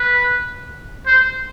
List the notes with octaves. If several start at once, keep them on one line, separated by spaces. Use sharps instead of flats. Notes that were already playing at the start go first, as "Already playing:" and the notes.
Already playing: B4
C5